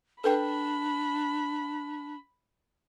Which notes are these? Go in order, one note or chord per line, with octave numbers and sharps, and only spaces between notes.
D4 A4 B4 G5 B5